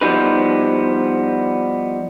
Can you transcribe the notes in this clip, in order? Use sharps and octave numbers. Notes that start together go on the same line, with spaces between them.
F3 G3 B3 D#4 B4